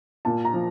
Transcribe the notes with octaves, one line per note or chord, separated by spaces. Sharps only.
A#2 A5
A#5
F3